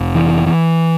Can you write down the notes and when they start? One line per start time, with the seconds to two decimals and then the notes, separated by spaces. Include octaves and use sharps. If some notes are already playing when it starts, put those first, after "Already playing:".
Already playing: F1
0.15 E3
0.46 E3